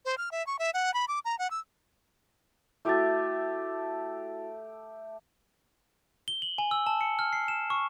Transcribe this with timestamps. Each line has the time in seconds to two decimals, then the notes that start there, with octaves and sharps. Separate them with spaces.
0.05 C5
0.18 F6
0.31 E5
0.47 C#6
0.59 E5
0.74 F#5
0.94 B5
1.08 D6
1.25 A#5
1.39 F#5
1.51 E6
2.85 A3 E4 F#4 G4 E5 A6
6.28 G7
6.42 F#7
6.58 G#5
6.71 E6
6.87 A5
7.01 C#7
7.19 F6
7.33 C7
7.48 E7
7.70 C#6